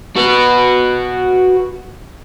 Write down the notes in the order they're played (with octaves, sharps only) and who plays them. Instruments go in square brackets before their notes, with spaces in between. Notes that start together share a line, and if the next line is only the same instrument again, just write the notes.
[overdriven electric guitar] F#4 B4